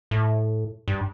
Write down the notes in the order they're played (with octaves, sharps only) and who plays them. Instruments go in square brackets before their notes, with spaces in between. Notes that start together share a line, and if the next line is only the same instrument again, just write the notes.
[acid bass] A2
G2